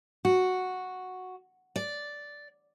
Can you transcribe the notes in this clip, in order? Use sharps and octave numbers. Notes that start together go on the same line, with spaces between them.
F#4
D5